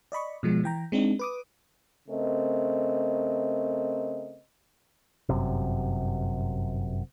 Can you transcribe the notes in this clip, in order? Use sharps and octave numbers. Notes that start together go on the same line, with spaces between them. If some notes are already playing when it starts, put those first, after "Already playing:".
D5 D#5 B5 C#6
B2 F3 G#3
E3 G5 A#5
G#3 C4 D4 D#4
B4 D6 D#6
C#3 A3 C4 A#4 D#5
G1 F#2 C3